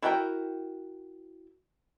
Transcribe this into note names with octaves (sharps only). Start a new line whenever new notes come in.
E4 F#4 A#4 F#5 G5